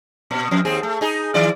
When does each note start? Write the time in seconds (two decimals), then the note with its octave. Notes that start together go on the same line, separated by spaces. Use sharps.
0.31 A#2
0.51 F2
0.65 D#2 C4 G#4
0.83 A3
1.01 D#4 G#4
1.34 D#3 E4 D5